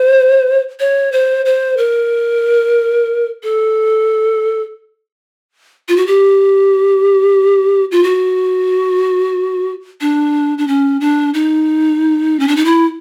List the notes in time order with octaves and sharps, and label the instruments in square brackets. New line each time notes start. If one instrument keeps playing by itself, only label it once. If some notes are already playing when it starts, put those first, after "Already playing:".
Already playing: [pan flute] C5
C#5
C5
C5
A#4
A4
F4
F#4
G4
F4
F#4
D4
D4
C#4
D4
D#4
C#4
D4
D#4
E4